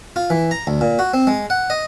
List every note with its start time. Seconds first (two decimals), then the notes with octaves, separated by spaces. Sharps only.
0.16 F4
0.30 E3
0.51 A#5
0.67 D2
0.81 A#2
0.99 F#4
1.14 C4
1.27 G#3
1.50 F#5
1.70 D#5